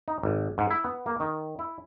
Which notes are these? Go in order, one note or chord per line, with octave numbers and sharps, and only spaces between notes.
D#4
G#1
G#2
E4
B3
A#3
D#3
E4